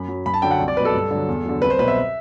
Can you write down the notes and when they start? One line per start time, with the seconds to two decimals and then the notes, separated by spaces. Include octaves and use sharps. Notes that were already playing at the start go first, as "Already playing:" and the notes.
Already playing: F#2 B5
0.08 F#3
0.26 F#2 B5
0.34 A5
0.42 D3 F#3 G5
0.51 F#5
0.60 C2
0.68 D5
0.76 F#3 B4
0.80 B2
0.85 A4
0.94 G2
1.11 D3 F#3
1.28 E2
1.44 D3 F#3
1.62 C2 B4
1.70 C5
1.79 B2 F#3 B4
1.88 E5